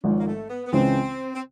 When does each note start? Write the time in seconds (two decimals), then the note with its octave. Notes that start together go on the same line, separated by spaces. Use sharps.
0.03 G#1 G#2 F3 C#4
0.19 A#3
0.27 A3
0.50 B3
0.66 B3
0.72 C#2 C#3 E3 G#3 C4
1.34 C4